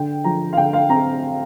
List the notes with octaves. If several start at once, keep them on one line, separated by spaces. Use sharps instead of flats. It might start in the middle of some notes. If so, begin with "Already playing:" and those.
Already playing: D3 G5
F3 A#5
F5
D3 G5
F5
C4 A#5